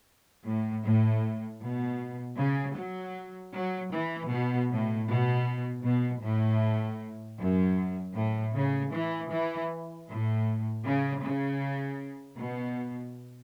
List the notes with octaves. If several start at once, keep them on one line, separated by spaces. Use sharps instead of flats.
A2
A2
B2
C#3
F#3
F#3
E3
B2
A2
B2
B2
A2
F#2
A2
C#3
E3
E3
A2
C#3
C#3
B2